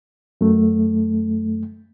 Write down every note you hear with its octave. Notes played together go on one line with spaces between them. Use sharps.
F#2 A3